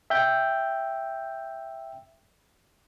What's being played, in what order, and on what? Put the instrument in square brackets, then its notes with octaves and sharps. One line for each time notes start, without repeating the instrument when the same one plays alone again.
[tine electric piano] E5 G5 G6